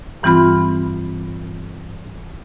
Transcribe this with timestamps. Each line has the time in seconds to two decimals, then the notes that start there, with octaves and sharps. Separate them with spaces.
0.23 G2 E3 G3 C4 F4 B5